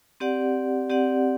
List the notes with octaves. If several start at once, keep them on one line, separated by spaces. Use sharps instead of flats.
C4 G4 D5 F#5
C4 G4 D5 F#5